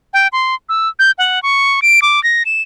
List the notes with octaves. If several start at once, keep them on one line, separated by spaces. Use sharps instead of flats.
G5
C6
E6
G6
F#5
C#6
D7
D6
A#6
E7